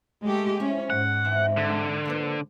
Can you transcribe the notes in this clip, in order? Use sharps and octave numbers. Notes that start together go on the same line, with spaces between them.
G#3 A3 G4
F3 C#4 E4
G#2 F#5
E3 C4 E5
D3
F3 A#3 B4